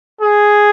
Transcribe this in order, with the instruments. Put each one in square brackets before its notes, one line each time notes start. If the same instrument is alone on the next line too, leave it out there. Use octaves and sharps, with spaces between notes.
[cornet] G#4